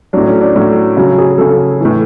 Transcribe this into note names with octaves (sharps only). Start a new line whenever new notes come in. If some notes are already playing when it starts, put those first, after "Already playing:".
A2 F#3 D4
C#4
D4
A2 F#3
C#3 F#3
G#4
C#3 F#3 A4
A2 E3